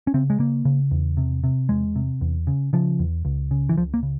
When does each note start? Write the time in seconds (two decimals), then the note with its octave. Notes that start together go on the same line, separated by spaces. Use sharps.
0.07 C#4
0.14 C#3 C4
0.30 G#3
0.39 C#3 A#3
0.65 C#3
0.91 E2
1.17 C3
1.44 C3
1.69 E2 G#3
1.96 C3
2.21 E2
2.47 C#3
2.73 C#3 F3
2.99 E2
3.25 C#2
3.51 C#3
3.69 E3
3.77 C#2 F3
3.94 A#3
4.03 C#3